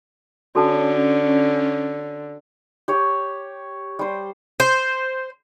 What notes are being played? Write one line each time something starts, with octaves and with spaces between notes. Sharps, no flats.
D3 C#4 F#4 A4 A5
G4 C#5
G3 C5
C5